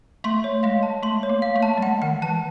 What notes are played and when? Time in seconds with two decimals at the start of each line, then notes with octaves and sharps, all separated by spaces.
0.24 A3 C6
0.44 C#5
0.63 G#3 F5
0.83 A5
1.03 A3 C6
1.23 C#5
1.29 A#3
1.42 F5
1.56 A3
1.63 A5
1.77 G3
1.83 G#3 F#5
2.02 D#3 F#5
2.22 E3 A5